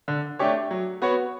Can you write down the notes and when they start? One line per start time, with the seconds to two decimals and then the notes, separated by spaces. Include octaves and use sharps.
0.08 D3
0.39 A3 D4 G4 C#5
0.71 F#3
1.02 B3 F#4 C#5